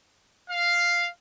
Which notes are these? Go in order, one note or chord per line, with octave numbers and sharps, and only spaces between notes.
F5